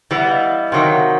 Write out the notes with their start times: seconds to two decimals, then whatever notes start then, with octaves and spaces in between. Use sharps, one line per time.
0.11 E3 G3 B3 E5 F#5
0.31 D#5 F5
0.52 E5 F#5
0.72 C3 D#3 F#3 F5 G5
0.92 E5 F#5